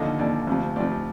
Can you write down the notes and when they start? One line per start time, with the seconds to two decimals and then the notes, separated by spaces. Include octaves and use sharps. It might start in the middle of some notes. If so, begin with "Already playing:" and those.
Already playing: D#2 D3 F3 D#5
0.19 D#2 D3 F3 D5
0.47 D2 C3 F3
0.76 D2 C3 F3 D5